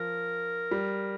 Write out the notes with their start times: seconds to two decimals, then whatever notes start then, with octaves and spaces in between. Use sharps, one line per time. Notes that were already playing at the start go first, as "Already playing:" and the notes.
Already playing: F3 A#4
0.71 G3